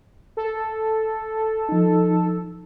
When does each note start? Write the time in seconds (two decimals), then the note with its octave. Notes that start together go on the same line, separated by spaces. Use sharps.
0.37 A4
1.69 F3 D#4